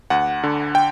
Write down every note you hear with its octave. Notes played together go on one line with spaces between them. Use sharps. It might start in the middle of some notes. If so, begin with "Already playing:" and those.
D2 F#5
D3
G5